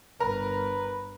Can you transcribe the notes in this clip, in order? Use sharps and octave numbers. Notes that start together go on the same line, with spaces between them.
G1 A#4 B4